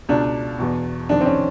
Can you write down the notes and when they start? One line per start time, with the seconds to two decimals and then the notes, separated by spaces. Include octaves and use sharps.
0.09 C#2 B2 D4
0.59 E2 B2
1.09 F2 C3 D#3 D4
1.21 C4
1.26 C#4